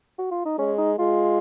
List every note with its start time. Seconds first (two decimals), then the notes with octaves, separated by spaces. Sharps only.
0.19 F#4
0.31 F4
0.46 D#4
0.58 G#3 C#4
0.78 D#4
0.99 G#3 F4